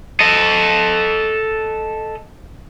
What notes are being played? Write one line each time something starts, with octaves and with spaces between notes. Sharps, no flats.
A4 D#5